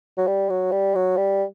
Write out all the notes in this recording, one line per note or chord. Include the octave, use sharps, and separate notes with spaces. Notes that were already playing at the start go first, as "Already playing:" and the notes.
F#3
G3
F#3
G3
F#3
G3